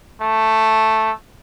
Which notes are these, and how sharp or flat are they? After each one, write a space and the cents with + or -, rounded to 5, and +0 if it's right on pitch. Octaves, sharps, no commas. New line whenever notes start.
A3 +0